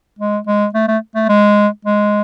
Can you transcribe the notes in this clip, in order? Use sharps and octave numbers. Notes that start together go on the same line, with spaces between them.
G#3
G#3
A3
A3
A3
G#3
G#3